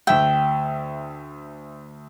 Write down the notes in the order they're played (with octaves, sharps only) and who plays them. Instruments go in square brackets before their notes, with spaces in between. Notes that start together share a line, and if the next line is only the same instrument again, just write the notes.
[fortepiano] D2 E5 E6 [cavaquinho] G5